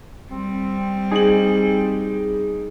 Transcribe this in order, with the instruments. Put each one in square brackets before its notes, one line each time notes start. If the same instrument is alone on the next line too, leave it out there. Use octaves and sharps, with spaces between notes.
[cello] G3 [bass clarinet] C4
[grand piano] D#4 F#7 [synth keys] G#4